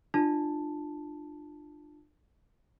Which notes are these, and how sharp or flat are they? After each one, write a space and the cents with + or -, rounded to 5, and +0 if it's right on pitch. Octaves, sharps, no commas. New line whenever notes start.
D4 +30 F4 -5 A5 +0